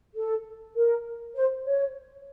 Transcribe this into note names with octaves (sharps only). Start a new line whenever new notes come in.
A4
A#4
C5
C#5